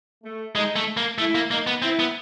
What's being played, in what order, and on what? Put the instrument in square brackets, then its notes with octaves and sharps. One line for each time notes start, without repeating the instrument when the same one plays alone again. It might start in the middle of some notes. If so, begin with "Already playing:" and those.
[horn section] A3
[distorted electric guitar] G#3 [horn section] D#4
[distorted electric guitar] A3
A#3
[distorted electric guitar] A3 [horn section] E4
[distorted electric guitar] A#3
[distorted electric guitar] A#3 [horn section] D#4
[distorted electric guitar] B3
[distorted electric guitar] C4 [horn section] E4
[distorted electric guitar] B3